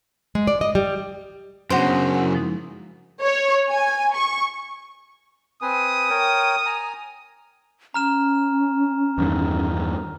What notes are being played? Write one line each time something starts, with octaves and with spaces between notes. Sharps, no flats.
G#3
D5
D#5
G3
F#2 C#3 B3 D4 F#4 C5
C#4
E4 F#5
F3 G#3 D#4
C#5
G#5
C#6
C4 B4 G#5 D#6
A#4 C#5 G5
G#5 A#5
C#4 A#5 F6 E7
E2 G2 D#3